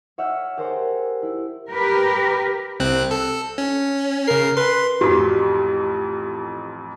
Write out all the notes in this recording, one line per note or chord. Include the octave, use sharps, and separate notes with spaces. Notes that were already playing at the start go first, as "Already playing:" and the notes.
C#5 E5 F#5 E6 F6 G6
G4 G#4 A#4 C5 D5 F#5
E4
G4 A#4 B4
C2 C4 F#6
A4
C#4
C#3 A#4 C7
B4 C6
A1 F2 F#4 G4 B6